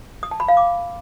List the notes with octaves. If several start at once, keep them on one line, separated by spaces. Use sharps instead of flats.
D#6
A5
B5
F5
D6